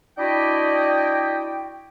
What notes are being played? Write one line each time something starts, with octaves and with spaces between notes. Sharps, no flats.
D4 E4 F#4 D5 D#5 G5